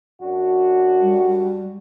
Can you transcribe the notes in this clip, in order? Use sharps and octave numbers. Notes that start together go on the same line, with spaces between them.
F#2 D4 F#4
G3